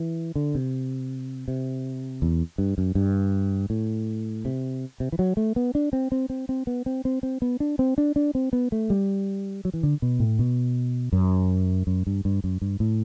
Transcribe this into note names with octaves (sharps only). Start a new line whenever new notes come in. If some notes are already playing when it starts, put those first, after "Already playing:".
Already playing: E3
D3
C3
C3
E2
G2
F#2
G2
A2
C3
C3
E3
F#3
A3
B3
D4
C4
C4
C4
C4
B3
C4
C4
C4
B3
D4
C4
D4
D4
C4
B3
A3
G3
F#3
E3
D3
B2
A2
B2
F#2
F#2
G2
G2
F#2
G2
A2